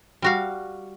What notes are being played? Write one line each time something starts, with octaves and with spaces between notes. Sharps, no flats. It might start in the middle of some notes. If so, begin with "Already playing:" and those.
G3 F#4 F5